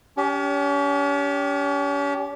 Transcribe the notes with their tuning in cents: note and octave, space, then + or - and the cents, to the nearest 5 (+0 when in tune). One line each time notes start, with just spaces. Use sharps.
C#4 +40 G4 +0